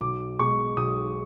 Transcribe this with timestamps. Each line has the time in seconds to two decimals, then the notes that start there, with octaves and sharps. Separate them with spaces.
0.01 B1 D6
0.39 B2 G#3 C#6
0.77 B1 D#6